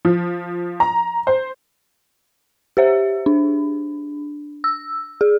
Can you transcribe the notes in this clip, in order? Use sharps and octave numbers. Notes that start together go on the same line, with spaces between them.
F3
A#5
C5
G4 C5 E5
D4
E6
G#4